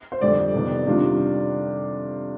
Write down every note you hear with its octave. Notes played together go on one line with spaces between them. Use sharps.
C5
F2 D3 G3 C4 D5
F2 C3 D#3 B3
C3 D#3 G3 D4 F4